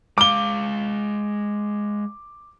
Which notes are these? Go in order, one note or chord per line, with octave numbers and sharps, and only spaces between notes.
G#3 F5 D6 G7